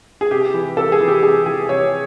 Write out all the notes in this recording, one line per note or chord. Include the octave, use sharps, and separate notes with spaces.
G#4
C3 G4
E3
C3 A4
G#4
E3
G4
C3 G#4
E3 G#4
C3 C#5